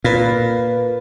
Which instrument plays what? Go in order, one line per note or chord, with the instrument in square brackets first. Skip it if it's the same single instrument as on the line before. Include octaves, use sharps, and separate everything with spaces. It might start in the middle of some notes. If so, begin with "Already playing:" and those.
[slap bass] A#2 [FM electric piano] A#4 B4 F5